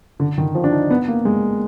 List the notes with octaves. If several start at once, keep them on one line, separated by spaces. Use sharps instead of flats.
D3
D#3
F3
D4
D#4
B3
A#3
G#3